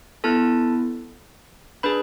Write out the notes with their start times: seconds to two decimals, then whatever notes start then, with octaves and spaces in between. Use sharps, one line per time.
0.24 B3 E4 A4 A5
1.83 D4 G#4 B4 B5